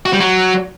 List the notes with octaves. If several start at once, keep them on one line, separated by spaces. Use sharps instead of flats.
F#4
G3
F#3